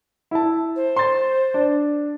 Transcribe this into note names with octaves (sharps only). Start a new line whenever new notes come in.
E4 A5
C5
C6 A6
D4